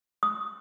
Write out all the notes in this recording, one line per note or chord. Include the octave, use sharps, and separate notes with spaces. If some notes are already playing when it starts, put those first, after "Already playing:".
D#6